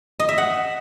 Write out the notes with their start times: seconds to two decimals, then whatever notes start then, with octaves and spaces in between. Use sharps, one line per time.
0.20 D#5
0.29 E5
0.38 F#5